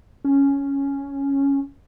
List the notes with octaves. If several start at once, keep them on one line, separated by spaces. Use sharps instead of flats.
C#4